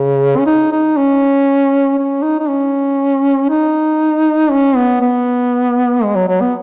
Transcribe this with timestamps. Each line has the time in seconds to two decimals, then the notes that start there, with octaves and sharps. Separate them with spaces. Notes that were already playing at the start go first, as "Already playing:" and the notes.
Already playing: C#3
0.37 C#4
0.46 D#4
0.72 D#4
0.97 C#4
1.98 C#4
2.23 D#4
2.39 D#4
2.49 C#4
3.49 D#4
4.51 C#4
4.76 B3
5.01 B3
6.03 G#3
6.16 F#3
6.28 F#3
6.41 B3